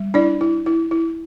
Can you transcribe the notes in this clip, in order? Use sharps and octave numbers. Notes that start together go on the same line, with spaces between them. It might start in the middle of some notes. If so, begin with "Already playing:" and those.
Already playing: G3
D4 E4 D5
E4
E4
E4